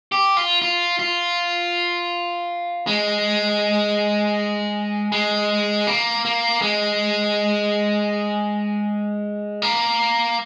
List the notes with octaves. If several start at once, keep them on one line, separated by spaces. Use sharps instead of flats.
G4
F4
F4
F4
G#3
G#3
A#3
A#3
G#3
A#3